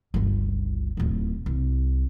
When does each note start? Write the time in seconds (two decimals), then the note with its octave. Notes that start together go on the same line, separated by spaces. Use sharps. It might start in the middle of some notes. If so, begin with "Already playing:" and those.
0.14 G1 C#2
0.97 D1 D#2
1.46 C2